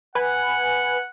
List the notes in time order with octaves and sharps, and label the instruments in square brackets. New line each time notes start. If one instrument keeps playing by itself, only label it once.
[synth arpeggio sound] B4 G#5 [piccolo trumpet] F#5